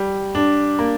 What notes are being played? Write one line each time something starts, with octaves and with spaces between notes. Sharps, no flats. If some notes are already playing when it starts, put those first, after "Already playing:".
Already playing: G3
D4
A#3